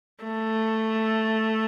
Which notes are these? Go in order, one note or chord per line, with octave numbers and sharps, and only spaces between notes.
A3